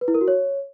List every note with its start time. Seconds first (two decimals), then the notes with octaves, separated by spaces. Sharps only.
0.01 B4
0.08 E4
0.14 A#4
0.21 F#4
0.28 C#5